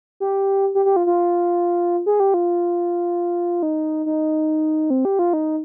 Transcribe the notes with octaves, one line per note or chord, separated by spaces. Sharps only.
G4
G4
G4
F4
F4
G#4
G4
F4
D#4
D#4
C4
G4
F4
D#4